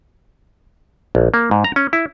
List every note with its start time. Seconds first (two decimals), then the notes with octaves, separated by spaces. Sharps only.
1.15 A#1
1.34 A#3
1.51 G#2
1.64 A#5
1.76 C#4
1.93 E4